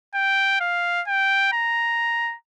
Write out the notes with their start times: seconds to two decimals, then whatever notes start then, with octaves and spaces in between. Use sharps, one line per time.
0.15 G5
0.60 F5
1.07 G5
1.52 A#5